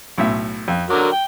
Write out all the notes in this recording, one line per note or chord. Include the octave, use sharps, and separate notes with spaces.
B1 A2 E5
F2
D3 F#3 A#4 D6
G5